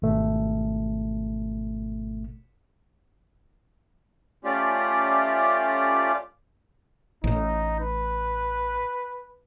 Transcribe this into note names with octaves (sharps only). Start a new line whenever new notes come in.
G#1 B2 A3
A3 C#4 F4 G4 D5
A1 A2 D#4
B4